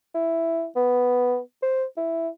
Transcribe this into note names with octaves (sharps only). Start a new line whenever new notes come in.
E4
B3
C5
E4